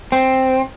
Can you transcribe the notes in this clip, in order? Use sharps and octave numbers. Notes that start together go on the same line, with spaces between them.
C4